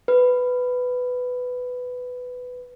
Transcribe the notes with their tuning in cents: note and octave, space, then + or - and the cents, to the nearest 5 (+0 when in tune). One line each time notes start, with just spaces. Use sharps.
B4 +10